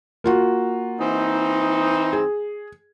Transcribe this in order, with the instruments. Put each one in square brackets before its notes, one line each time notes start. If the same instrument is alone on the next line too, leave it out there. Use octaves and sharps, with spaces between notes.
[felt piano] A#3 F4 F#4
[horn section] E3 C4 D#4
[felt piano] G#4